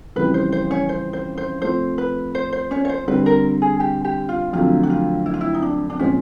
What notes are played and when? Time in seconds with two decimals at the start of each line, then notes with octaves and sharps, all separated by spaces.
0.16 F2 C#3 E3 G3 B4
0.34 C5
0.52 C5
0.71 C#4 C#5
0.89 C5
1.13 C5
1.38 C5
1.62 F3 A3 C4 C5
1.98 B4
2.35 C5
2.53 C5
2.71 C#4 C#5
2.85 C#5
2.89 C5
3.08 D3 G3 C4 B4
3.26 A#4
3.62 G#4
3.80 G4
4.05 G4
4.29 F4
4.53 F2 D3 F#3 A3 F4
4.83 F#4
4.90 F4
5.26 E4
5.34 F4
5.41 E4
5.54 D#4
5.62 D4
5.90 D4
5.99 A#2 F3 G#3 C4 C#4